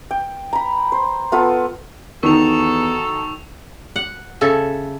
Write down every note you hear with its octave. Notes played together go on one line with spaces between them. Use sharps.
G5
A#5 B5
C5
B3 F4 A4 B4
E2 D#3 D#4 F#4 A4 C#6 F7
F#5
C#3 A4 E5